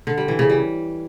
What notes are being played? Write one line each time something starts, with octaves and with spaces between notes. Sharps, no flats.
D3
G3
E3
C#3
G3